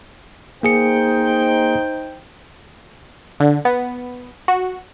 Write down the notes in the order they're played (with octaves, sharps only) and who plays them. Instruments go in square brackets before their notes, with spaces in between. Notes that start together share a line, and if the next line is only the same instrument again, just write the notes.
[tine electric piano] A#3 G#4 C#7 [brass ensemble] D#4 C5 G5
[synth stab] D3
B3
F#4